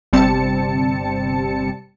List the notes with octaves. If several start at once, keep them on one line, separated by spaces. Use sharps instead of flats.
G1 C3 G3 C4 A5 C#7